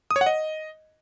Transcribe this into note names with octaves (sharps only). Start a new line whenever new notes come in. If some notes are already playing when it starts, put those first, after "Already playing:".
D#6
C#5
F#5
D#5